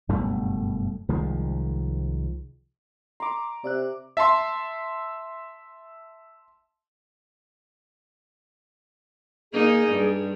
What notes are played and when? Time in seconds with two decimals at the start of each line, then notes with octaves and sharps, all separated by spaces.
0.09 F#1 G2 B2 A3
1.09 C2 D#3 F3 G#3
3.20 A#5 C6 D6
3.64 C3 D5 E5 F#6
4.17 E5 A5 C6
9.53 A#3 D#4 G#4
9.88 G2